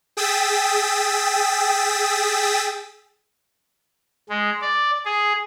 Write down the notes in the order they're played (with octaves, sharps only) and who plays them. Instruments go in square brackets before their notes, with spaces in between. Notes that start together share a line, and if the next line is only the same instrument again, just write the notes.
[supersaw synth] G#4 G5 D#6 E6 A6 B6
[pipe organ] G#3
D5
G#4